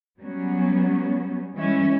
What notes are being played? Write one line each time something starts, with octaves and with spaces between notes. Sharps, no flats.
F#3 G3 B3 C#4
E3 G3 G#3 C#4 E5